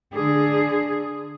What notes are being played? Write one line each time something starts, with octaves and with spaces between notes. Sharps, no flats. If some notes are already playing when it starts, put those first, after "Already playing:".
D3 G#4